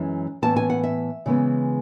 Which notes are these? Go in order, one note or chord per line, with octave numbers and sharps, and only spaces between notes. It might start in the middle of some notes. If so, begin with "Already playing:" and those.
Already playing: F#2 E3 G#3 C#4
A2 E3 B3 A5
G#5
F#5
E5
C#3 E3 G#3 B3